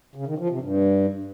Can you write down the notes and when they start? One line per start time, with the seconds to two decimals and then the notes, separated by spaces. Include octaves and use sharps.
0.15 C#3
0.27 D#3
0.38 F3
0.50 C3
0.61 G2